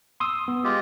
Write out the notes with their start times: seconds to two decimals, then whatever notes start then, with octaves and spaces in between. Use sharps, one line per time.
0.20 C6 D#6 E6
0.48 B3
0.64 G#3 F4 G4